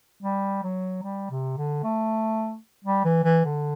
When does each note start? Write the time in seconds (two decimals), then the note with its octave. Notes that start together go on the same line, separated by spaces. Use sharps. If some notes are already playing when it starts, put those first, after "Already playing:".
0.23 G3
0.64 F#3
1.03 G3
1.31 C3
1.57 D3
1.84 A3
2.85 G3
3.05 E3
3.24 E3
3.45 D3